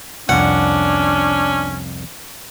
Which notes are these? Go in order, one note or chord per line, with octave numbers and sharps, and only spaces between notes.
C2 F2 C#4 D4 F#5